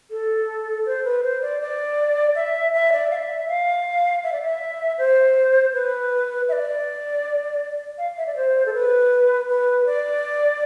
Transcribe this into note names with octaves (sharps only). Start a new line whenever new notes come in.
A4
C5
B4
C5
D5
D5
E5
E5
D5
F5
E5
F5
E5
D5
E5
C5
B4
E5
D5
F5
E5
D5
C5
A4
B4
B4
D5